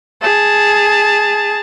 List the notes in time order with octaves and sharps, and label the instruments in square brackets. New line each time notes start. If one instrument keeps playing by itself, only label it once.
[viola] G#4 A5